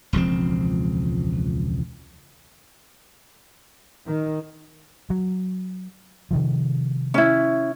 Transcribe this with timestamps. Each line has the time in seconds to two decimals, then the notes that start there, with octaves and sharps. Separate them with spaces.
0.13 E1 C#2 F3 C4
4.07 D#3
5.10 F#3
6.31 C3 D#3 F3
7.14 C#4 E4